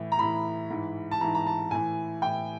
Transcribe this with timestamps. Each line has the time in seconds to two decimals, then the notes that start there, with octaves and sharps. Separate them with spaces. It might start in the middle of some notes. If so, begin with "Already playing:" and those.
Already playing: A2 E3
0.12 A#5
0.19 A2 E3 B5
0.70 G#2 E3
1.11 A5
1.21 G#2 E3 A#5
1.35 A#5
1.47 A5
1.71 A2 E3 G#5
2.22 A2 E3 G5